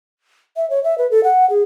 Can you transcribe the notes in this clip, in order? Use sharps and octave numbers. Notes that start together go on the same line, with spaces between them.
E5
C#5
E5
B4
A4
F#5
G#4